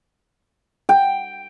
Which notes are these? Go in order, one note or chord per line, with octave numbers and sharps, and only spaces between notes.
G5